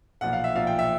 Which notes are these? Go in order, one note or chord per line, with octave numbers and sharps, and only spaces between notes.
B1 A#2 F3 F#5
F5
E5
B1 A#2 F3 F5
G5
E5